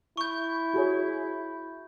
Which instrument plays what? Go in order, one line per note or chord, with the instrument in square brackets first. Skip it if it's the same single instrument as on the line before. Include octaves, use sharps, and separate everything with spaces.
[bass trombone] E4 [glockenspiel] C#6 G6
[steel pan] F#4 G#4 C#5